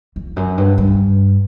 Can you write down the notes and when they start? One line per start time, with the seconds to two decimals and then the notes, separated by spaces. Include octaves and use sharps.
0.16 F2
0.36 F#2
0.58 G2
0.78 G2